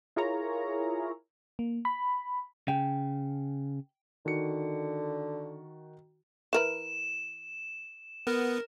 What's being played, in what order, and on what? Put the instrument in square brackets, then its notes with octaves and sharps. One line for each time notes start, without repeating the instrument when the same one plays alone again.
[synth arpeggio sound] E4 F4 G#4 A#4 C#5 A#5
[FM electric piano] A#3
B5
[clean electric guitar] C#3 [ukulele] G5
[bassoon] D3 [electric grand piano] D#3 F#4 C#7
[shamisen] E3 A#4 B4 [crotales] E7
[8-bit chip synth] B3 [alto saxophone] A#4